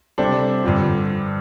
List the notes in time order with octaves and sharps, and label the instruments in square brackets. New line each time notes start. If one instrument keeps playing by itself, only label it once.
[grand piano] C3 G3 D4 A4 C5
G2 D3 F3